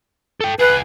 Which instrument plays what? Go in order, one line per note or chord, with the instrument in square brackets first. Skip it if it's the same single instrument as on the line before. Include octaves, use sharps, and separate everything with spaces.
[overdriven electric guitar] A4 G5
[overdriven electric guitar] F4 G#4 [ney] B4